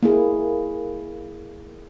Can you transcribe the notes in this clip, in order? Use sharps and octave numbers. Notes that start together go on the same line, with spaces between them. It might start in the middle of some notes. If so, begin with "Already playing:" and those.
A#3 E4 G#4